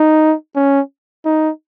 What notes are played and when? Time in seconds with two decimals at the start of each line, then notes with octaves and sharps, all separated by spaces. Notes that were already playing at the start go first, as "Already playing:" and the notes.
Already playing: D#4
0.56 C#4
1.25 D#4